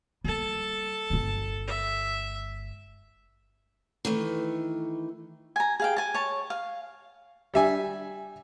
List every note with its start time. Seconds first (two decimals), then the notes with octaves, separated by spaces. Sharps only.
0.24 G3 A#3 A4 A5
1.10 G1 G#3
1.67 E5
4.05 D#3 E3 A3
5.56 G#5 A#5
5.80 G#4 F5 G5
5.96 G#5 A5
6.14 C#5 A5
6.50 F5
7.54 G3 E5 G#5